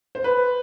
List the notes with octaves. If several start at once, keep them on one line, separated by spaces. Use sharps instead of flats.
C5
B4